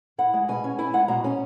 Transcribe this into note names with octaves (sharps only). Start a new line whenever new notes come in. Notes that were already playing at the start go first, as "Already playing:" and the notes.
E4 F#5
G#3
B2 G#5
C#4
E4 G#5
G#3 F#5
B2 A#5
C#4 G#5